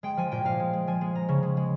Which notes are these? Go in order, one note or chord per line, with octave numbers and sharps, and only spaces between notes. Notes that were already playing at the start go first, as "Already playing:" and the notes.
G#3 G5
F3 G#5
A#2 G5
A#2 F5
G#3
G#3
F3 G#5
G#3
G#3 A#5
C#3
G#3
G#3